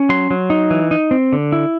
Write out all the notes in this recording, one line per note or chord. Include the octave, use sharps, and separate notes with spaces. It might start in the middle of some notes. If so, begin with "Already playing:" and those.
Already playing: C#4
F#3 C6
F#3
D#4
E3
D#4
C4
D3
E4